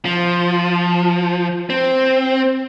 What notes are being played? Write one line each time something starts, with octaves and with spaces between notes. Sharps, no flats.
F3
C4